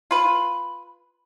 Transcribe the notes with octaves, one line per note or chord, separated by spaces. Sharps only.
F4 B4